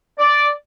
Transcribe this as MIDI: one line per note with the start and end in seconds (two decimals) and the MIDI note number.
0.19 0.47 74